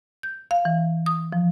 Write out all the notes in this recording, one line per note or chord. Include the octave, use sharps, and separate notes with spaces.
G6
F5
E3
D#6
F3